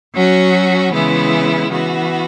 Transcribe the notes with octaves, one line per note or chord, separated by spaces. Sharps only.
F#3 C#4 F#4
C#3 E3 G#3 B3 E4
E3 B3 F#4